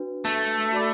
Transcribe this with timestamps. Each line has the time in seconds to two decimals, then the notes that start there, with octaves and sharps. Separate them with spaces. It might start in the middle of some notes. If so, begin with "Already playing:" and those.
Already playing: D4 F#4 B4
0.25 A3
0.72 F#4 D5 B5 D6